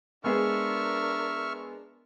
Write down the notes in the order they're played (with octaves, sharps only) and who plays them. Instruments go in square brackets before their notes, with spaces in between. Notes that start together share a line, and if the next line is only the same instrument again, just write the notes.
[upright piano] G#3 B3 G#4 [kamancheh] D4 A#4 [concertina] E5 C#6 F6